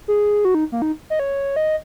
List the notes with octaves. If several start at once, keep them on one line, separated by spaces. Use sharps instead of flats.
G#4
F#4
D#4
A#3
D#4
D#5
C#5
D#5